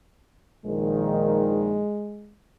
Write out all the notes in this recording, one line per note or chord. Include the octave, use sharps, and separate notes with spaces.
A#1 D#3 G#3